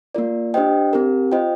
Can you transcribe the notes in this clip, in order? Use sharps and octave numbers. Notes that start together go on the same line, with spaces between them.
A#3 F4 A#4 D5
D4 G4 C5 D#5 G5
C4 G4 A#4
F4 C5 D#5 G5